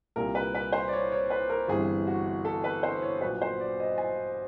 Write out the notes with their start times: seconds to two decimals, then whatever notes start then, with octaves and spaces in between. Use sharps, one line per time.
0.16 C2 A#2 G3 A#3 A#4
0.35 B4
0.55 B4
0.72 C5
0.88 D5
0.93 C#5
1.12 C#5
1.30 B4
1.50 A#4
1.68 G1 G2 E3 G3 C4 G#4
2.07 F#4
2.45 A4
2.64 B4
2.83 C5
3.02 C#5
3.21 A#1 A#2 F#3 B4
3.41 C5
3.60 D5
3.80 D#5
3.98 G#5